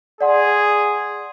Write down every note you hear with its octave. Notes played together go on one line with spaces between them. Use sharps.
G#4 D5 F#5 C6